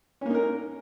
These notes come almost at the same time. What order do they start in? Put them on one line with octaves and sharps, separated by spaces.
C#4 A#3 D#4 A#4